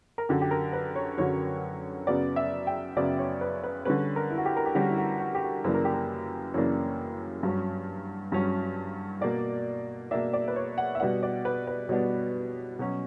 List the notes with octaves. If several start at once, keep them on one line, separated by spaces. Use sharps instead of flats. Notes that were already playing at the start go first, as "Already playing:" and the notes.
A#4
F#2 D3 F#3 G4
G4
A#4
B4
C#5
F#2 D3 F#3 C#5
F#2 C#3 F#3 B3 D5
E5
G5
F#2 C#3 F#3 B3 D5
C#5
B4
B4
D3 G3 C#4 B4
A#4
E4
F#4
G4
A#4
G4
D3 G3 C#4 F#4
E4
F#4
F#4
G4
F#4
F#2 C#3 E3 A#3 D4 B4
A#4
G4
A#4
F#2 C#3 E3 A#3 D4 C#5
G2 F#3 C#4
G2 F#3 C#4
B2 A#3 D4 D5
B2 A#3 D4 E5
D5
B4
C#5
F#5
E5
B2 G3 B3 D4 F#5
D5
B4
B4
B2 G3 B3 D4 C#5
B2 F#3 C#4